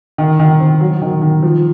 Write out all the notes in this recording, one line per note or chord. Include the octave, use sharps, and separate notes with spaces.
D#3
D#3
C4
F#3
D#3
D#3
F3